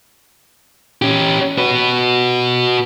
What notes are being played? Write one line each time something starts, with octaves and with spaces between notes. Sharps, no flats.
C#4 G4
F#4 B4